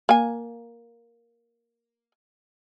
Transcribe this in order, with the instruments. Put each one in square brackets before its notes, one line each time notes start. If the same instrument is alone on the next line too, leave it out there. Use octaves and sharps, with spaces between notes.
[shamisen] A#3 G#5